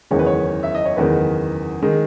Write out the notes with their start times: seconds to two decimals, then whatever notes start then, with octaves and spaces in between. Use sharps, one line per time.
0.11 F#1 E2 D#3 G#3 C#5
0.19 B4
0.26 C#5
0.63 E5
0.75 D#5
0.85 C#5
0.96 F#1 E2 D#3 G#3 B4
1.82 D#3 G#3